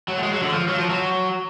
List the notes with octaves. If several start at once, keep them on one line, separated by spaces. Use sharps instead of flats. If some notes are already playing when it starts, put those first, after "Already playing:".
F#3
A3
G#3
F#3
D3
F3
F#3
F3
F#3